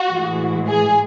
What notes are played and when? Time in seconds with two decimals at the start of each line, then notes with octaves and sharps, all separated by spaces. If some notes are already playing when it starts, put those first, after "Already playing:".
Already playing: F#4
0.09 A2 E3 G#3
0.67 G#4